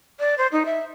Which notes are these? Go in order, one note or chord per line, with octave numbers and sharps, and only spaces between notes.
D5
C5
D#4
E5